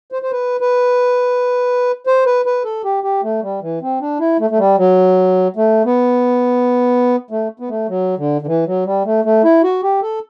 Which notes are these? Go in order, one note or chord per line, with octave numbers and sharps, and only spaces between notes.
C5
C5
B4
B4
C5
B4
B4
A4
G4
G4
A3
G3
E3
C4
D4
E4
A3
A3
G3
F#3
A3
B3
A3
B3
A3
F#3
D3
D3
E3
F#3
G3
A3
A3
E4
F#4
G4
A4